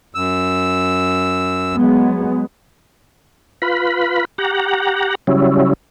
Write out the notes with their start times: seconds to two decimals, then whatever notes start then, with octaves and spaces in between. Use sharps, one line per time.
0.15 F#2 E6
1.75 F#3 G#3 B3
3.62 F4 B4 B5
4.38 G4 F#5 A#5
5.27 C#3 F#3 G3 C#4 E4